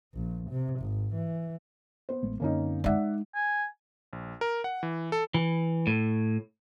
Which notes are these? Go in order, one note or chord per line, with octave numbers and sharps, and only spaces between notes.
A#1
C3
G#1
E3
B3 C5
A1 G#3 A3
F#2 D3 A#3 C4 C#4 D#4
G#3 D#4 D5 E5 F#5
G#5
A#1
A#4
F#5
E3
A4
E3
A2